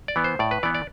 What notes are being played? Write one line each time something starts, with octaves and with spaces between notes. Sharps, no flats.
D5
E3 B3
C5
A2 D5
B4
E3 B3 D5
D5